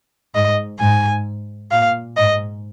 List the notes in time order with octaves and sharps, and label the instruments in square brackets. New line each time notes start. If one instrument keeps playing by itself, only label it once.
[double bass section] G#2 [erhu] D#5
[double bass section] G#2 [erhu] G#5
[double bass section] A#2 [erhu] F5
[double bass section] G#2 [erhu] D#5